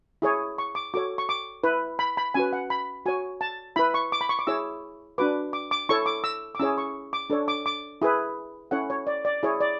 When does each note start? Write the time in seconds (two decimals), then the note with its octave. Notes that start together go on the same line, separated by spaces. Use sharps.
0.22 E4 G#4 C#5
0.58 C#6
0.75 D6
0.94 F#4 A4 C#5 D6
1.18 C#6
1.29 D6
1.64 E4 B4
1.99 B5
2.17 B5
2.34 C#4 F#4 B4 G#5
2.53 F#5
2.70 B5
3.06 F#4 C#5 G#5
3.41 A5
3.76 E4 B4 B5
3.94 C#6
4.12 D6
4.21 B5
4.29 C#6
4.39 D6
4.47 E4 G#4 C#5 E6
5.18 D4 F#4 B4 D6
5.53 D6
5.71 D6
5.89 E4 A4 C#5 C#6
6.06 D6
6.24 E6
6.55 D6
6.59 C#4 E4 G#4 C#5 E6
6.78 C#6
7.13 D6
7.30 D4 A4 C#5
7.48 D6
7.66 D6
8.02 E4 G#4 B4
8.71 C#4 E4 A4 C#5 F#5
8.90 C#5
9.07 D5
9.25 D5
9.43 E4 G#4 C#5
9.61 D5